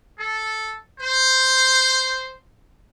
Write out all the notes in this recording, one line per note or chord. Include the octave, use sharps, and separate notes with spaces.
A4
C5